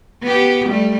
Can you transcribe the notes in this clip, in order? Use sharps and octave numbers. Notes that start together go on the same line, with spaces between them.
B3 G4
G3 A3